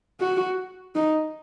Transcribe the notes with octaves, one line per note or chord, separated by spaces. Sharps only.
F#4
D#4